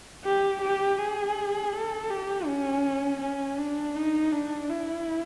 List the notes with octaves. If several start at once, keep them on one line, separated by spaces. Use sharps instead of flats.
G4
G4
G#4
A4
G4
C#4
C#4
D4
D#4
D4
E4